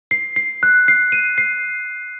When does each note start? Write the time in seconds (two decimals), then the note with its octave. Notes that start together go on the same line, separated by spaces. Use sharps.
0.11 C7
0.36 C7
0.63 F#6
0.88 C7
1.12 D#7
1.38 C7